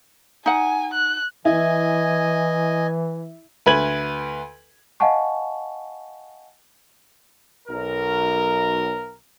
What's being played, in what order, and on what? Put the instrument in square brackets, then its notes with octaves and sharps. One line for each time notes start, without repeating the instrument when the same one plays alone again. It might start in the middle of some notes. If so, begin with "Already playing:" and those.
[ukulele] D#4 F#5 [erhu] G#5
[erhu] F#6
[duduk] E3 [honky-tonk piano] E4 [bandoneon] D#5 G#5
[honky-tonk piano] D2 B4 G#6 F#7
[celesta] D#5 F5 F#5 G#5 A5 C#6
[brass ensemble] B1 A#4